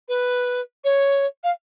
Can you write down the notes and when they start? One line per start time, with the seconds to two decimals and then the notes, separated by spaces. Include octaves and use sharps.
0.08 B4
0.84 C#5
1.43 F5